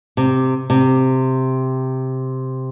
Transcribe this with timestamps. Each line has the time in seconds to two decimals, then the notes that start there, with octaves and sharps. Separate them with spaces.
0.17 C3
0.70 C3